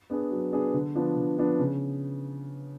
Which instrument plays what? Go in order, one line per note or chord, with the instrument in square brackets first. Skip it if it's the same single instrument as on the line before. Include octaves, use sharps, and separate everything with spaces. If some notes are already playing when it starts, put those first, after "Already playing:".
[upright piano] B3 D4 G#4
F#3
B3 D4 G#4
D3
F3 B3 D4
D3
F3 B3 D4
C#3